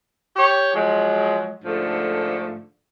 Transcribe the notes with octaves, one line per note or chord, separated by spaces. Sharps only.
G4 C#5
F3 F#3 G#3
G#2 D3 F3 A3